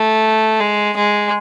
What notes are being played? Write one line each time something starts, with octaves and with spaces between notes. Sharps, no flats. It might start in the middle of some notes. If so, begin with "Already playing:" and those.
Already playing: A3
G#3
G#3